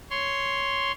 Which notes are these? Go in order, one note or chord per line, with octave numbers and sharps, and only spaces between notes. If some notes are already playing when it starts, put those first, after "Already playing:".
C#5 C6